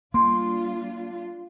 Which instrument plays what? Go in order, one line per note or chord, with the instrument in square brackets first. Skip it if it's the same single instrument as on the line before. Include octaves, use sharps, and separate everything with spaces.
[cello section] G3 D4 F4 [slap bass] A#3 [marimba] C6